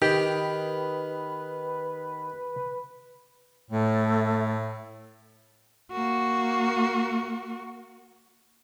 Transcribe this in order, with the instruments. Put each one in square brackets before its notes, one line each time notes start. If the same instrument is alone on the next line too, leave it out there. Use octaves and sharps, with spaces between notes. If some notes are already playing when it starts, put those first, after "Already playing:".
[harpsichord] D#3 [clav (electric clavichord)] G4 [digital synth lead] B4
[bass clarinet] A2 [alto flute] A3
[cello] A#3 F#4